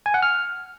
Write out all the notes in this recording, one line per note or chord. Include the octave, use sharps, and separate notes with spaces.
G#5
F#5
F6